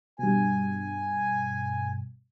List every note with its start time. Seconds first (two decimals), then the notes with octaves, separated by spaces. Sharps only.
0.19 G2 B2 G#5